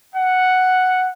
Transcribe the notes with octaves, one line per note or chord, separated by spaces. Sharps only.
F#5